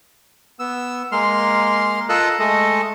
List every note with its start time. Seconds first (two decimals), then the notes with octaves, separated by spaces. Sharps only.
0.59 B3 E6
1.12 G#3 A#3 C6 F6
2.09 F4 A4 A#4 D#5 E6 F#6
2.40 G#3 A3 A4 D#5